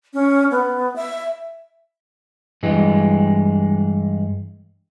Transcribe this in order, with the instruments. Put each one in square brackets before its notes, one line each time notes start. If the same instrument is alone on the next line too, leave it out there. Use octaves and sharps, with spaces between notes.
[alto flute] C#4
B3
E5
[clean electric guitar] G2 E3 G#3